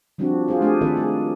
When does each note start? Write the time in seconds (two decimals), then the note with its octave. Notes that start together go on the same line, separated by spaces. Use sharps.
0.18 F3 G3 C4 D4 F#4
0.48 F4 F#4 G#4 C5
0.61 A3 D4 G4 G#4
0.81 D#3 C4 A4 B4 D5 E5
0.97 G#4